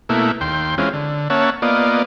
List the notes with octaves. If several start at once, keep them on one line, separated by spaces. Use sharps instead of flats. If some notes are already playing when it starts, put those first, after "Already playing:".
B2 A3 A#3 E4
D#2 G5 C6
E3 G#3 C4 C#4 F4
D3
A#3 C#4 C#5 E5 F#5 A5
A#3 B3 F4 D5 D#5